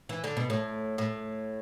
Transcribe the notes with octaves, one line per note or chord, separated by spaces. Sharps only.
E3
D3
B2
A2
A2